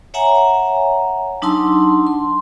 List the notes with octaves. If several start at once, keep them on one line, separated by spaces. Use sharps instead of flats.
C#5 E5 F#5 G#5 A#5
F#3 D4 D#4 A5 C6 E6
C6